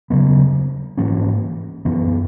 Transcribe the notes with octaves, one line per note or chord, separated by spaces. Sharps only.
C#3 F#3 B3
G#2 E3 A#3 C#4
F#2 E3 B3